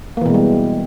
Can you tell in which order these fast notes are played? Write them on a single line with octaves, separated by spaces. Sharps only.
A#3 E3 B2 G#3 G3